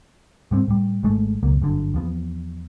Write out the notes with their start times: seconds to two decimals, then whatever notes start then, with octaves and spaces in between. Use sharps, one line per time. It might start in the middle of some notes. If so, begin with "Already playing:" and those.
0.51 G#2 G3 C4
0.67 A2 G3
1.03 G#1 G#2 G#3 A3
1.43 E1 C#2 F#2 A#3
1.62 G1 F#2 D3
1.94 E2 F3 B3